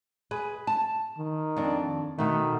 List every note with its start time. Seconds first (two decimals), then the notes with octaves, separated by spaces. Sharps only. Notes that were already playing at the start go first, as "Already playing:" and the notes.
0.31 G#4 B4
0.67 A5
1.18 D#3
1.56 F2 D4
2.19 B2 D#3 A3